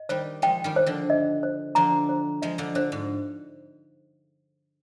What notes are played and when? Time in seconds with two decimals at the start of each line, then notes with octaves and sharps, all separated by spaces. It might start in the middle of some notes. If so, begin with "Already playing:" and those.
Already playing: D#5
0.09 D#3 G3 C5
0.42 F3 G#3 G5
0.64 D#3 G3
0.76 C5
0.86 D3 F3
1.10 D#5
1.43 C5
1.75 D3 F3 A#5
2.09 C5
2.42 F3 G#3 D#5
2.58 D3 F3
2.75 D3 C5
2.92 G#2